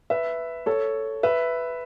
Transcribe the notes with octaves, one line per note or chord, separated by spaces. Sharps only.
B4 E5
A4 C#5
B4 E5